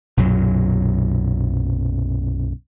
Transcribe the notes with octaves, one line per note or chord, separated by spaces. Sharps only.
B1 F#2 A#2 F#3